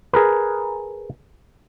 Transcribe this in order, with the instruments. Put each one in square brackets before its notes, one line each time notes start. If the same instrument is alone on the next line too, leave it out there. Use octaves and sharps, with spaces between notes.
[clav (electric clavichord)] G#4 A#4 B4